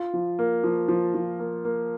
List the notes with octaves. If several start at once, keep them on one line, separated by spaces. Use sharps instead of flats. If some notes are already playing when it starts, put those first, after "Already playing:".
Already playing: F4
F3
A#3
F3
F3
F3
A#3
A#3